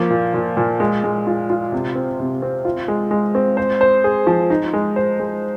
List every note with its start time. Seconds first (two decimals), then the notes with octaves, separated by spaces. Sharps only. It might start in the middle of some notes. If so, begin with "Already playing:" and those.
Already playing: F3 A#3
0.10 A#2
0.34 A#2
0.57 A#2
0.80 G#3
1.04 G#3
1.27 F4
1.50 F4
1.72 C3
1.95 C4
2.19 C3
2.42 C4
2.65 F4
2.88 G#3
3.11 G#3
3.35 C4
3.57 C5
3.81 C5
4.04 G#4
4.27 F3
4.50 D#4
4.73 G#3
4.96 C5
5.19 G#3